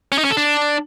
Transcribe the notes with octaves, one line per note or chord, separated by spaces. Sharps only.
C#4
D#4
C#4
A4
D4